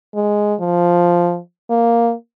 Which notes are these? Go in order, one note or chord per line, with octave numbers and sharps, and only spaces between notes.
G#3
F3
A#3